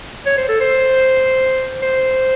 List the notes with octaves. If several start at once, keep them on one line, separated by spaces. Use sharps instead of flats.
C#5
C5
A4
C5
C5